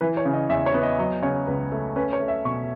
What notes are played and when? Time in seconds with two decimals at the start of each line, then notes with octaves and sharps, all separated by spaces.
0.01 E3 B4
0.17 C#5
0.25 C#3
0.34 D#5
0.49 E2 E5
0.66 C#5
0.74 B3
0.83 D#5
0.99 F#3 D#5
1.22 C#3 C#5
1.47 C#2 B4
1.72 A3
1.96 C#4 B4
2.13 C#5
2.20 A3
2.28 E5
2.45 B2 C#6